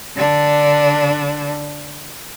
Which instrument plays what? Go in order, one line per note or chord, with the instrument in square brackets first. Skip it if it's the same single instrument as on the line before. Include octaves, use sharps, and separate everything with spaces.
[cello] D3 D4